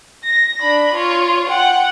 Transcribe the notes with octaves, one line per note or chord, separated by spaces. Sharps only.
A#6
D4 B5
F4 C#5
F#5 G5